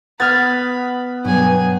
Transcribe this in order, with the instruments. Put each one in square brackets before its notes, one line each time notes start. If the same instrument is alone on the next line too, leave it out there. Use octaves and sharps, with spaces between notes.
[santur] B3 [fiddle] B5 [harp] F6 G#6 A6
[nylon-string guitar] G2 B2 F#3 [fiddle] G#4 G#5